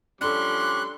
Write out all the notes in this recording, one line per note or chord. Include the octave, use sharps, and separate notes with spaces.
F3 G3 C#4 D4 A4 C6 F#6